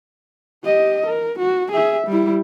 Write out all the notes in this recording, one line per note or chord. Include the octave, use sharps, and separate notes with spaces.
G4 D#5
A#4
F#4
G#4 E5
G3 E4